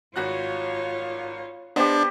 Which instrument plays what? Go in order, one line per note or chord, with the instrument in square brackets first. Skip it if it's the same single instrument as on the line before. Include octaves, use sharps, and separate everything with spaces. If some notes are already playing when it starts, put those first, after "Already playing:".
[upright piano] G#1 F#4 F#6 [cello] F4 C#5
[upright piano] B3 C5 [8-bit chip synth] D4 [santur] G4 D#5